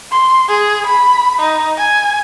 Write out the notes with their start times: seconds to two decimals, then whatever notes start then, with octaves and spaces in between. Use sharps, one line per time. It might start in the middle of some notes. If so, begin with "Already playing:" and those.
0.11 C6
0.48 G#4
0.87 B5
1.39 D#4
1.78 G#5